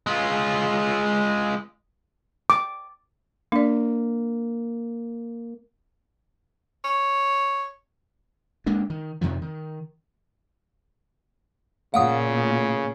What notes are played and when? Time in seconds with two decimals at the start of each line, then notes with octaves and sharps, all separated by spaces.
0.07 G#3 F4
2.50 D6
3.52 A#3 D4 D5
6.84 C#5
8.66 D2 G#3 A#3 D4
8.90 D#3
9.21 F2 C3 D#3 F3
9.42 D#3
11.94 A#2 C#3 F5 F#5 D#6